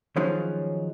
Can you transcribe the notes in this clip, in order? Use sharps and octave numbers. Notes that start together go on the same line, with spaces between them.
D#3 F3 F#3 G#3 C#4 D#4